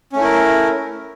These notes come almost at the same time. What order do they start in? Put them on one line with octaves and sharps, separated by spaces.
C#4 A3 E4 A#4